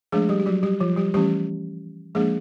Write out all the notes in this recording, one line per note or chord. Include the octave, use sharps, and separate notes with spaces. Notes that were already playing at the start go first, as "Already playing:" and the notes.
F3 G#3 A3 D4 G#4
G3 G4
G4
F#3 F#4
G3 G4
F3 F4
G3 G4
E3 G3 A3 C#4 G4
F3 G#3 A#3 D4 G#4